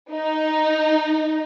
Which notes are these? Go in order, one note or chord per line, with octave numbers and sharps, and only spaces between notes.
D#4